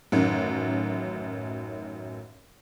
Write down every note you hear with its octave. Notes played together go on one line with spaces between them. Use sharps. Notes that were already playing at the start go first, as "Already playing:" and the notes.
A1 F#2 D#3